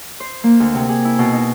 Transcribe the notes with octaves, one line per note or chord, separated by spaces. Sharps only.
C5
A#3
D2
C3
G#4
E4
B2
D#4